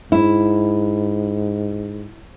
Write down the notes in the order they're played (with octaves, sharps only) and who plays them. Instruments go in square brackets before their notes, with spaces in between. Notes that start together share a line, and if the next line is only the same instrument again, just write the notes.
[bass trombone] G#2 [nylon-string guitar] E4